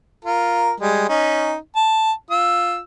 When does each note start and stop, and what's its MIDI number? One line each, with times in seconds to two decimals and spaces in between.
0.25 0.73 65
0.25 0.73 70
0.80 1.08 55
0.80 1.08 56
1.09 1.56 61
1.09 1.56 63
1.76 2.12 81
2.31 2.80 65
2.31 2.80 88